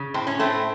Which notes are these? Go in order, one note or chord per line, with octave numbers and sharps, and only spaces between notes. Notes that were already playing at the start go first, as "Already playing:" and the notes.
Already playing: C#3
A2 C4
C#4
A2 A3 C4